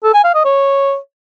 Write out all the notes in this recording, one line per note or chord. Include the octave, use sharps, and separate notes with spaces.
A4
G#5
F5
D#5
C#5